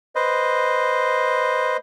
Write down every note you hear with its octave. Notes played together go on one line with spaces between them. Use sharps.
B4 C5 D#5